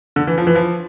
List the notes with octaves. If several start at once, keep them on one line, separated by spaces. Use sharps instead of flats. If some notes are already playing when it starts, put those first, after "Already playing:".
D3
E3
F3
E3
F3